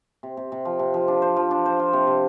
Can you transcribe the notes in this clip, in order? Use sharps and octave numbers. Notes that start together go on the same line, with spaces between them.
C3
C3
C3
F3
C3
F3
D4
C5
F3
D4
C5
F4
C3
C3